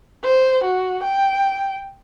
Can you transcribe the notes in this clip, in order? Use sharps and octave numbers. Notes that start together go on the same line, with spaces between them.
C5
F#4
G5